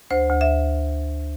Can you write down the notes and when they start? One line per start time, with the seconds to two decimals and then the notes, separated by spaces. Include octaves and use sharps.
0.11 D2 C5
0.30 D2
0.41 E5